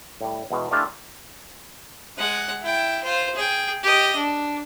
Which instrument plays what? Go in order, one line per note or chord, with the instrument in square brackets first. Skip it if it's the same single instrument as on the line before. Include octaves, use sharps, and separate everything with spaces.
[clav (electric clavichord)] A2 G3
E2 B2 G#3
A3 D4 E4 F4 G4 A#4
[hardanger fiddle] G#3 F#5
E4 G5
F4 C5
G#4 G5
G4 D#5
D4